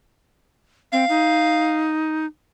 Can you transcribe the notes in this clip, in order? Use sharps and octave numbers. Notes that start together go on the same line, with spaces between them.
C4 F5
D#4